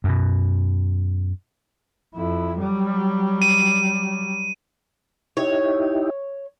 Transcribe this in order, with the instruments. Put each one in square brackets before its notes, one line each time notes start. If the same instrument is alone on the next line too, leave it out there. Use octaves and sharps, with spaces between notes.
[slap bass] F#2 B2
[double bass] F2 E4
F#3 G3
[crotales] D#7
[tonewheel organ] D#4 E4 G4 [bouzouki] C#5